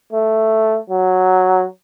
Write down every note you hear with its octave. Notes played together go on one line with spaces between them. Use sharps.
A3
F#3